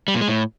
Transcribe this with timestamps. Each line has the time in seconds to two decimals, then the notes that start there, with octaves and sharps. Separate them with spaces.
0.08 G3
0.15 A#2
0.21 G#3
0.28 A2